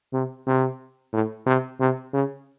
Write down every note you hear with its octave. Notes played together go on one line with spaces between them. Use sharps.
C3
C3
A2
C3
C3
C#3